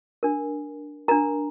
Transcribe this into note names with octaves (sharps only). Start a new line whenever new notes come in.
D4 A#4
D4 A#4 A#5